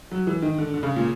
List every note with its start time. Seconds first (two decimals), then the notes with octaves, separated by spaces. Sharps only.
0.11 F#3
0.27 E3
0.42 D#3
0.58 D3
0.74 D3
0.83 C#3
0.96 A#2